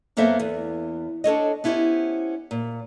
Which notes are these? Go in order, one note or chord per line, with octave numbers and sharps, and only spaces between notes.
F#2 A#3 B3 A4 C5 E5
E2
D4 A4 C#5 D#5
B3 C#4 E4 G4 C5
A#2